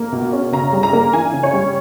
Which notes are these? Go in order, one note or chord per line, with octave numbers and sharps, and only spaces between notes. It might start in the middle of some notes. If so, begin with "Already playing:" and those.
Already playing: A#3
B2
C#4
C#3 A#5
G3
A#5
A#3
E3 G#5
C#3
C#5
G3